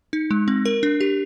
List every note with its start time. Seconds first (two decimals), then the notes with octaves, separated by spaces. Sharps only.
0.13 D#4
0.31 G#3
0.48 C4
0.65 A#4
0.83 D4
1.01 G4